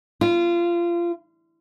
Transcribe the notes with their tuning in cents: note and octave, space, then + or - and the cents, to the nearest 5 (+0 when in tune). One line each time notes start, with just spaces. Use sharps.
F4 -25